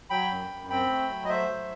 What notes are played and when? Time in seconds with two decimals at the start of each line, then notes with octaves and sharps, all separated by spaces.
0.10 F#3 G5 B5
0.31 F#2
0.51 F#2
0.70 C4 G5 B5
0.90 A3
1.09 F#3
1.25 D#5
1.29 A3 C5 E5
1.49 F#3